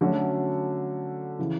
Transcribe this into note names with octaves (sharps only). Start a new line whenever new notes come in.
D3 F#3 A3 C#4 F#4
C#3 E3